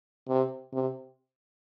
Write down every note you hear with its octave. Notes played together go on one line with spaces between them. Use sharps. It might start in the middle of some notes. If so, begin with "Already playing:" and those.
C3
C3